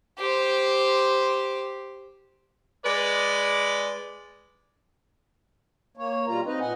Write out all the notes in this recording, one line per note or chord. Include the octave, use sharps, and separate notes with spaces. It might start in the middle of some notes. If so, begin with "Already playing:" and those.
G4 C5
G#3 B4 D5
A#3 C#5
B2 G3 F4 A#5
C4 D#4 B4 D#5
A#2 D#5 F#5 G#5